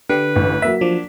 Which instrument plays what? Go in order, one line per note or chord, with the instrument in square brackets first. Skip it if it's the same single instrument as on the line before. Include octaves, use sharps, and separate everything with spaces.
[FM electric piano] D3 [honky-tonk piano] G4 [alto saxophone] B4
[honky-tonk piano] A1
[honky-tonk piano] F#3 A#3 B6 [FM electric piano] E5
[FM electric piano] F3 [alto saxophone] D4